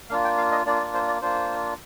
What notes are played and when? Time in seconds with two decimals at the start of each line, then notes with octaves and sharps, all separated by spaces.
0.10 A#3 D4 F4 F5
0.24 G5
0.37 F5
0.51 D#5
0.66 A#3 D4 F4 D5
0.80 D5
0.94 C5
1.07 D5
1.22 A#3 D4 F4 C5